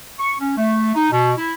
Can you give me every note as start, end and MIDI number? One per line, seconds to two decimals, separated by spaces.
0.20 0.33 85
0.40 0.54 61
0.58 0.93 57
0.95 1.11 63
1.12 1.32 47
1.38 1.54 64